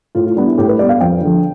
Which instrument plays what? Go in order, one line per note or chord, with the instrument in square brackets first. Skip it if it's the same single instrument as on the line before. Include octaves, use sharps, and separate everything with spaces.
[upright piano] A2 F4
F4
G3 B3 D4
E4
A2 G4
B4
G3 B3 D5
F5
F2 G5
D3
F3